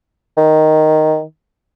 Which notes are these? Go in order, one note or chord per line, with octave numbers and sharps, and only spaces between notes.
D#3